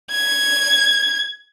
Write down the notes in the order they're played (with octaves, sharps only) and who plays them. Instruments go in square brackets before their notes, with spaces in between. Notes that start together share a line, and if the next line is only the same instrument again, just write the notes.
[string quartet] G#6